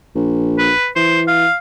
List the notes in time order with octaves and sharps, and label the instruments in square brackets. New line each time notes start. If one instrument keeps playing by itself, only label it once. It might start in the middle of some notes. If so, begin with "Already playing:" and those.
[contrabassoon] A#1
[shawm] B4
[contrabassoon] E3 [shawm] C5
[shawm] F5